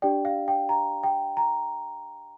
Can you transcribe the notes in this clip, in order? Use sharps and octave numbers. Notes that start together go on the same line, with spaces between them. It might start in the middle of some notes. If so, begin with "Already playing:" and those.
D4 G4 D5 G5
F5
G5
A#5
G5
A#5